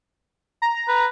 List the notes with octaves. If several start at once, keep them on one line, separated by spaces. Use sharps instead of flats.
A#5
B4